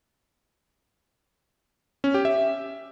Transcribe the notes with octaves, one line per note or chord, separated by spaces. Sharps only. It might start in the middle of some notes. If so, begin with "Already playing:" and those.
C#4
G4
E5